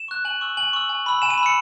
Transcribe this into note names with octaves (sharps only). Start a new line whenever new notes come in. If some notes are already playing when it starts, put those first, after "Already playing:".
Already playing: E7
C#6 F#6
G#5 F#7
C#6 E6
G#5 F#7
C#6 E6
G#5
B5 E6
G#5 E7
D#7
B5
E6 C#7